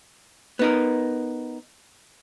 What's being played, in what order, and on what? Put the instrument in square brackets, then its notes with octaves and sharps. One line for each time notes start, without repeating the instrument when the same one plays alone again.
[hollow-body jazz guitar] B3 D#4 A#4